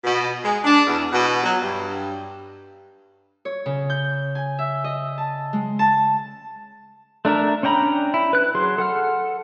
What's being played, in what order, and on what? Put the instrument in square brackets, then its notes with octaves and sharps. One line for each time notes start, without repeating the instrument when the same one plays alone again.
[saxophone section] B2
G#3
D4
E2
B2
F#3
G2
[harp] C#5
C#3
G6
G#5
E5
D#5
A5
G#3
A5
[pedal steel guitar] A3 D4 A#4 E5
C#4 D4 G5 A#5 B5
E4
B4 F#6
F#3 G#4 C6
A4 F#5 F6